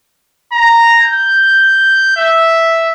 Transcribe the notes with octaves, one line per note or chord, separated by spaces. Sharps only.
A#5
G6
E5